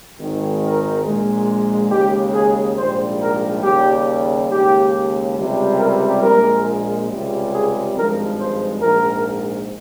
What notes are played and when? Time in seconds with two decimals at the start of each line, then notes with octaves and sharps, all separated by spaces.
0.19 G#1 G#2 D#3
0.62 A#4
1.05 A#1 A#2 G#3
1.91 D#2 C#3 G#3 G4
2.35 G#4
2.78 A#1 G#2 G3 C5
3.21 A#4
3.63 D#2 C#3 G3 G4
4.51 D#2 C#3 G#3 G4
5.36 C#2 C3 G3
5.79 A#4
6.23 A#1 A#2 G#3 A#4
7.09 C#2 C3 G3
7.52 G#4
7.96 G#1 G2 F3 G#3 A#4
8.39 C5
8.81 A#1 G#2 F3 A#4